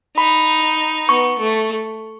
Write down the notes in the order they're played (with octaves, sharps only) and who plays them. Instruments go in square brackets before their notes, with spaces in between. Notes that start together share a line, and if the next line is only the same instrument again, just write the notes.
[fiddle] D#4 [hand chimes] B5
[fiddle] B3 [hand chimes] C#6
[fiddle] A3